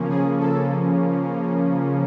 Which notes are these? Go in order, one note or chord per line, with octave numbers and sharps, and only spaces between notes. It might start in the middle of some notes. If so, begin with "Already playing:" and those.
Already playing: C#3 F3 A#3 C#4
G#4
A4